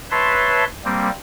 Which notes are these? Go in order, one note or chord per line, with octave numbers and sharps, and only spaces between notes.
B4 C#5 E5 A5 C6
G3 A#3 C4